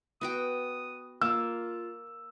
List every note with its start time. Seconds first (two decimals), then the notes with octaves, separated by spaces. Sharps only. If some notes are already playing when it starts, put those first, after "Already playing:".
0.21 B3 F#4 G5 D#6
1.21 A#3 F4 E6